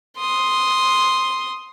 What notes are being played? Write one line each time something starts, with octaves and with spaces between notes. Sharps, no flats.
C6 D#6